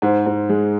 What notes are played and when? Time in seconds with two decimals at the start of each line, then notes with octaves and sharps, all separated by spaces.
0.02 G#2 C5
0.26 G#2
0.49 G#3